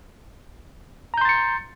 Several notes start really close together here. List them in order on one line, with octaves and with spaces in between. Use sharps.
A#5 G6 C6 A6 C#7